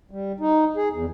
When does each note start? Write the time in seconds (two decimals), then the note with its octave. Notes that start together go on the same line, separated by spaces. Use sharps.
0.11 G3
0.40 D#4
0.77 G#4
0.93 E2